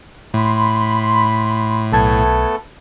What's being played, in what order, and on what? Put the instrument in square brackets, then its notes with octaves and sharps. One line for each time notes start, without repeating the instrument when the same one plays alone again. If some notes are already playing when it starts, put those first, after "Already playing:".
[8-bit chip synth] A2 [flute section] B5 C6
[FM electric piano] B1 A5 G#6 [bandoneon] A3 B3 A4